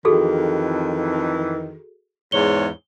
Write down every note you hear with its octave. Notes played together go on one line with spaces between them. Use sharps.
F2 D#3 E3 F#4 G#4 A4
E2 G#2 C#5 G7